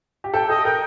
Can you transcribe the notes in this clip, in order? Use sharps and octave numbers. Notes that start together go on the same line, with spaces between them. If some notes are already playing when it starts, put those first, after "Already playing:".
G4
A4 G5
A4 D#5
A#4 G5